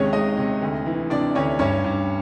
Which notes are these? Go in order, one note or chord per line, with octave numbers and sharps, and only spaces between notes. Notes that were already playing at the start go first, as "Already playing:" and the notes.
Already playing: D#2 C3 G#3 C#4 G#4 C#5
G#3 D#4 D#5
C3
D2
E3
C3 D4 D5
D2 C#4 C#5
G2 C#4 C#5
G2